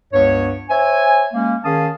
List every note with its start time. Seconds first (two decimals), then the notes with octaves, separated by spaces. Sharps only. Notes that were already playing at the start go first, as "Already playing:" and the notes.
0.12 C#2 G2 B3 C#5
0.69 C5 C#5 E5 G#5
1.34 G#3 A#3 C#4
1.64 D#3 C#4 G#4 F5 A5 D#6